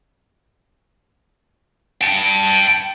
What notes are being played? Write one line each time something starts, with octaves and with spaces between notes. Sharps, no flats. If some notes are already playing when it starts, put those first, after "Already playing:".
G5 A5